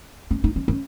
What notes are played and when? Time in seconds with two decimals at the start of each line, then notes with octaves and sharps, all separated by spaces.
0.31 C#4
0.44 D#4
0.56 C#4
0.68 C#4